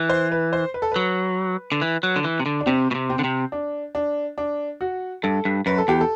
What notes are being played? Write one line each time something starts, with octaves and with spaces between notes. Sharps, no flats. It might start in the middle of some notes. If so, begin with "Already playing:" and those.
Already playing: E3
C5
B4
C5
B4
A4
F#3 B4
D3
E3
F#3
D3
E3
C3
D3
D4
C3 C4
B2
C3
C4
D3
C3
D4
D4
D4
F#4
G2 A4
G2
F#2 B4
A4
E2 G4
A4